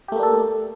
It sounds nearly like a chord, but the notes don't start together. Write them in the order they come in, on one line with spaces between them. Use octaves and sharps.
G4 A3 A#3 D4 A4